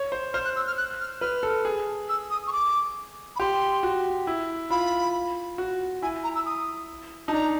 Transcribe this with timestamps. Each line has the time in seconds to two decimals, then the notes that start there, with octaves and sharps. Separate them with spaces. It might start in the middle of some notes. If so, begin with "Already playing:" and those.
Already playing: C#5
0.12 C5
0.34 C5 F6
0.45 F#6
0.56 E6
0.67 F6
0.78 F#6
1.00 F6
1.21 B4 F6
1.43 A4
1.65 G#4
2.09 E6
2.31 D#6
2.47 C#6
2.53 D6
3.36 B5
3.40 G4 C6
3.83 F#4
4.27 E4
4.70 F4 B5
5.58 F#4
6.02 E4 G#5
6.24 A#5
6.35 E6
6.46 D#6
7.28 D#4 A5
7.33 D4 A#5